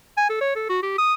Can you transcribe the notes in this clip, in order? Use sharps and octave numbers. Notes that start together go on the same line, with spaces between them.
G#5
A4
C#5
A4
F#4
G4
D#6